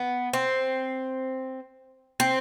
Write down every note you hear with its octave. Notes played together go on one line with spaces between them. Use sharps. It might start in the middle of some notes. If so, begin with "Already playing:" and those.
Already playing: B3
C4
C4